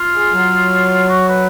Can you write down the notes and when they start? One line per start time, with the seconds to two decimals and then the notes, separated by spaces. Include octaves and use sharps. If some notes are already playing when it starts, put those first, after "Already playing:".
Already playing: F4
0.13 G#3
0.32 F#3
1.09 F#4
1.28 B4